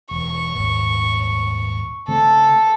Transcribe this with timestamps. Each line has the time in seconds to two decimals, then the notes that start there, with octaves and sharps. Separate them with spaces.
0.11 E1 C#6
0.55 D#1 G#1
2.08 C#3 A3 C4 A4